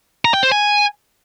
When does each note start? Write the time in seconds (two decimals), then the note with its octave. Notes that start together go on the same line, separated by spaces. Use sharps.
0.25 A#5
0.34 G5
0.43 C5
0.52 G#5